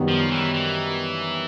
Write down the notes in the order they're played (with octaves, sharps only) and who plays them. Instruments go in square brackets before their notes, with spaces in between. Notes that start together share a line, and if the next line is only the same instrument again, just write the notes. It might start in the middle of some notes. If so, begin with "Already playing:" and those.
Already playing: [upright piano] F#2 D#3 G3 B3
[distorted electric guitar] F3
E3
E3